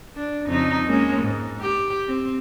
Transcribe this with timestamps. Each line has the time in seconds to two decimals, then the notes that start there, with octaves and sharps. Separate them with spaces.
0.16 D4
0.48 F2 C#3 D#4
0.86 G#3 A#3 C#4
1.23 G#2
1.61 G4
2.08 C4